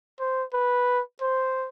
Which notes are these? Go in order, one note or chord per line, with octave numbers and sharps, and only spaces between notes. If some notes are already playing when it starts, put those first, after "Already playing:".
C5
B4
C5